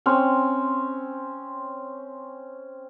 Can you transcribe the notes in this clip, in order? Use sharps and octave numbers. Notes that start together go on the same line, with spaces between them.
C4 C#4